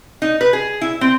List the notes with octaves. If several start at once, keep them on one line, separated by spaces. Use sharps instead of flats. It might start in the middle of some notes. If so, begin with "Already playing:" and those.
D#4
B4
G#4
E4
C4